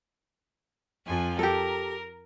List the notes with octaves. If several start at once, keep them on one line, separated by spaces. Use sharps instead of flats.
F2 F3 G#5
G4 A4 A#4